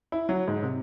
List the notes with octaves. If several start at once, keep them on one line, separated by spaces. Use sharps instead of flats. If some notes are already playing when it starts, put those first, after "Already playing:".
E4
F#3
G#2
C3